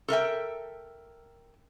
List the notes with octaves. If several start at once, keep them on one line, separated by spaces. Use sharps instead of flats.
A4 A#4 E5 G5